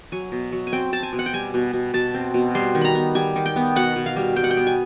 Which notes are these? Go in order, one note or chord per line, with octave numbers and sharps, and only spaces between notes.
F#3 G#5
B2
F#3
G#5
C4 G5
C4 A5
G#5
B2
F#5
G5
G3 G#5
B2
B2
B2 A5
C4
B2
G3 C6
D#3
A#5 B5
B3
G3 G#5
D#3
G5
B3
B2 F#5
B2
F5
G3
G3 G5
F#5
G5
B3
G#5